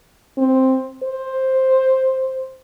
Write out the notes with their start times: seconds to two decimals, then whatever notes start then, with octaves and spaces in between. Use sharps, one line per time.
0.38 C4
1.03 C5